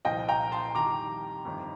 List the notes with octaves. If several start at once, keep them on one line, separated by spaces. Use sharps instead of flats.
C2 A#2 F3 D#5 G5
G5 A#5
A5 C6
F2 D#3 G3 A#5 D6
G1 F2 D#3